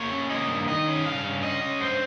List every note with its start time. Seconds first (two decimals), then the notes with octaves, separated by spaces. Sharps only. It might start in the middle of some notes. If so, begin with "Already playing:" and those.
Already playing: A#3 C#5
0.11 C#4
0.30 A#3 D#5
0.49 G2
0.68 D#3 D#5
0.86 C#4
1.05 G2 F5
1.24 C#4
1.43 C#4 D#5
1.62 C#4
1.80 G2 C5